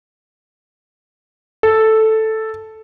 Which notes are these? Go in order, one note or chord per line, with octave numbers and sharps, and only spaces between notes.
A4